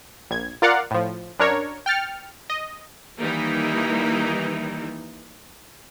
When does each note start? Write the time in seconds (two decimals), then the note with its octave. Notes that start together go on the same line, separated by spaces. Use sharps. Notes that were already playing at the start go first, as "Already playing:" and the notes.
0.31 A#1 G#6
0.62 F4 A#4 D5 F5 F#5
0.91 A2 F3
1.39 F#2 D4 A#4 C#5
1.86 G5 F6 A6 C#7
2.50 D#5
3.19 D#3 E3 G3 A#3 D#4 E4